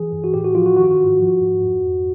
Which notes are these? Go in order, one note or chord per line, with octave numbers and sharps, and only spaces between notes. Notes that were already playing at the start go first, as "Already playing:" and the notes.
Already playing: E3 G#4
G2
F#4
A2 G4
F#4
F3 F4
F#4
D#3 F#4
F4
F#4
G#2
F3
G#2
F2
F2